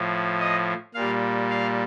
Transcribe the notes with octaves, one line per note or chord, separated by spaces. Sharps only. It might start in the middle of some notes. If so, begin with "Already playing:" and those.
Already playing: A2 F3
D#5
A#2 G3 F5
F5